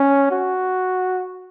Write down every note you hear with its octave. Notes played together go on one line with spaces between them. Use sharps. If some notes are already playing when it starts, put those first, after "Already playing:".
Already playing: C#4
F#4